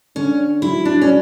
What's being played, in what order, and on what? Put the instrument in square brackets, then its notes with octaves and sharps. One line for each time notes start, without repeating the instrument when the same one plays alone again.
[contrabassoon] D3 [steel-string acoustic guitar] C#4
[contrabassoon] F#3 [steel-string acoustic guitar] E4
[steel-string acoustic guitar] D4
C#4